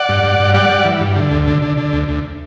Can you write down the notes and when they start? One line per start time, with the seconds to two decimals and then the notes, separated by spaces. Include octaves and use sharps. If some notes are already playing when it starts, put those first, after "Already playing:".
Already playing: D5 F#5
0.09 G2
0.23 G2
0.39 G2
0.54 G3 D5 F#5
0.69 G3
0.85 E3
1.01 G2
1.16 D3
1.31 D2
1.47 D3
1.62 D3
1.77 D3
1.93 D2
2.08 D2